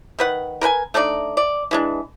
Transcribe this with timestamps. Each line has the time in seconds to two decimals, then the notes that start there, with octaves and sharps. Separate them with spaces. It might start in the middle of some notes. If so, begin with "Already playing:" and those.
0.19 D#3 B4 F#5
0.61 A#4 B4 G5 G#5
0.94 A3 D4 D#4 D5
1.37 D5
1.71 E3 G#3 D4